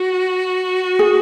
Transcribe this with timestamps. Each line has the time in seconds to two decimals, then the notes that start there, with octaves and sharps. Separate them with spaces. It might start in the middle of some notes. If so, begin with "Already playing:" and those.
Already playing: F#4
0.99 G#4